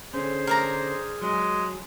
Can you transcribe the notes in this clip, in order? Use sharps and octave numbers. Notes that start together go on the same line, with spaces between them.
D3 C#4 G#4 C5
A#4 D5 A#5
F#3 G#3